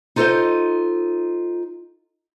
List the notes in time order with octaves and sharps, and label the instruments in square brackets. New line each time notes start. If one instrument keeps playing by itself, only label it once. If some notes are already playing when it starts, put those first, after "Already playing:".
[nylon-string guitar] D#4 F4 A4 B4 C5 D#5